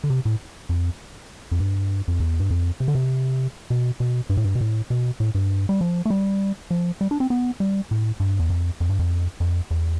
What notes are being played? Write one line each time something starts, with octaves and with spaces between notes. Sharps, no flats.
D3
C3
A2
F2
F2
G2
F2
E2
G2
F2
C3
D3
C3
B2
B2
G2
A2
G2
B2
A2
B2
A2
G2
G3
F3
A3
G3
F3
G3
D4
C4
B3
G3
A2
G2
E2
F2
F2
G2
F2
F2
E2